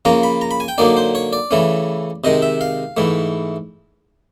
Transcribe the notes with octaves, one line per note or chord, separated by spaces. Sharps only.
C#3 F3 A#3 C#4 A#5
B5
A#5
B5
G#5
G5
D3 F#3 A#3 D#4 D5
C5
C#5
D5
C#3 E3 A3 C#4
C3 D#3 G#3 D#5
E5
F5
G#2 E3 A3